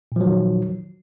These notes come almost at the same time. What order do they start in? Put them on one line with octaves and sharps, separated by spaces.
A#2 F3 F#3 D#3